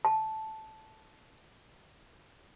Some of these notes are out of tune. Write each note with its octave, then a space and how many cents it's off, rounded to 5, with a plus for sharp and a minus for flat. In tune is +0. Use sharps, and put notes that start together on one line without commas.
A5 -5